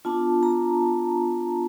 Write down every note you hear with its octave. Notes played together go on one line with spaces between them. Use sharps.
B3 D4 F4 A5
A#5
A5